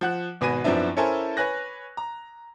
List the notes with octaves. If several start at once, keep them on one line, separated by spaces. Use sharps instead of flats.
F3 F#5 F#6
G#1 B2 B4 G#5 A#6 D#7
F#2 F3 B3 C4 D4 E4
C#4 E4 A4 A#4 C5 G#5
B4 C#5 G#5 F#6 A#6
A#5